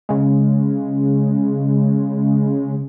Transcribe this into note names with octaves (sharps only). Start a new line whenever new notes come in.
C#3 G#3